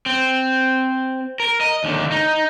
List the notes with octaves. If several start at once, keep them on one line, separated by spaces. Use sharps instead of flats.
C4
A#4
D#5
D#2 D3
D#4